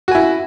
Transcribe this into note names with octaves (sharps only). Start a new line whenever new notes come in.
E4 F#4 G#5